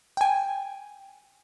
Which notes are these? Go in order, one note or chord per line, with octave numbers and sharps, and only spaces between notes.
G5 G#5